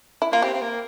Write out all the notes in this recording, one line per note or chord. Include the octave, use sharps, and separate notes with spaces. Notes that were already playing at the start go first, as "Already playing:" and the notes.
E4
A#3 F4
C4 G4
C4
A#3